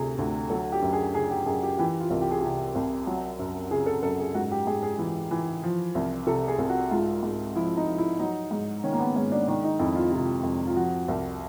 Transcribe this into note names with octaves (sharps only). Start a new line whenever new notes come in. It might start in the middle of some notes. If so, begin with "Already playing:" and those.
Already playing: D2 C3 G#4 A4
D2
F#3 A4
G4
F#2
G#4
C#3 G#4
G4
F#2 G#4
G4
E3 G4
F4
C2
G4
G#4
C3 G4
C2
F#3
F#2
C#3 G#4
A4
F#2 A4
G#4
G#2 F#4
G4
G#2 G#4
G#4
E3
E3
F3
C2
C3 A4
G#4
C2
F#4
G#2 F4
G#2
F3 E4
D#4
F3
E4
F#3 D#4
G#2
D#3 C#4
A#3
B3
G#2 C#4
D4
D#3 D4
D#4
F2 E4
F4
C3
F2
F4
F3 F#4
C2